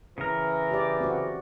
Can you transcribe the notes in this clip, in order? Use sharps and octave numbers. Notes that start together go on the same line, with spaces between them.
C#3 E3 A#4
G4 D5
C4 F#4